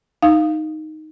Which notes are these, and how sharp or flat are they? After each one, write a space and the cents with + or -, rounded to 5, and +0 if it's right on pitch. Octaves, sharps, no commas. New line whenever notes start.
D#4 +0 F5 -5